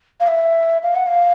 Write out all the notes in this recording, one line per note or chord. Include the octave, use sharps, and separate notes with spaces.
F5
E5
F5
F#5
F5